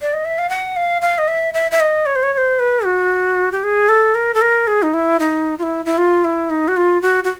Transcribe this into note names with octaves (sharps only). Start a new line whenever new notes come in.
D5
D#5
E5
F5
F#5
F5
F5
D#5
E5
E5
E5
D#5
C#5
C5
C#5
C#5
C5
B4
F#4
G4
G#4
A4
A#4
A4
A#4
G#4
D#4
E4
D#4
F4
E4
E4
F4
E4
D#4
F#4
F4
F#4
F#4